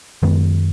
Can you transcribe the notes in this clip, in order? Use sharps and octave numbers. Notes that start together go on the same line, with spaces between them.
F#2 D#3 G#3 B3